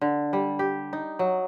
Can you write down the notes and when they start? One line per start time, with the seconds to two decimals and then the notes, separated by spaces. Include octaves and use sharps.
0.01 D3
0.33 G3
0.59 G4
0.93 D#4
1.19 F#3